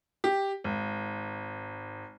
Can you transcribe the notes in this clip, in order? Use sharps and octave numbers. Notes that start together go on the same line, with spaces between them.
G4
G#1